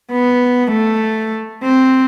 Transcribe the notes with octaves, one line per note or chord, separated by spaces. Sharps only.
B3
A3
C4